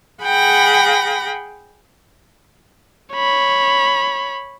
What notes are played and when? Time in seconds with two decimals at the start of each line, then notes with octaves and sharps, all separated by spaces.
0.23 G#4 F#5 G5 B5 A#6
3.14 C#5 B5